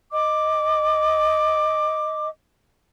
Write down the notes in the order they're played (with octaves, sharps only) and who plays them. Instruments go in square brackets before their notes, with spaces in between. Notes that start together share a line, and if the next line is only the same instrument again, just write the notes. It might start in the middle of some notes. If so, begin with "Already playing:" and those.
[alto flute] D#5 [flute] D6